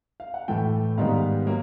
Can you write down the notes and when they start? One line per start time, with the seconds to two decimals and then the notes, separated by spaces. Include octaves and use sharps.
0.20 F5
0.34 F#5
0.48 A2 E3 A3 G5
0.98 G#2 D#3 G3 B3 F5
1.47 F#3 A#3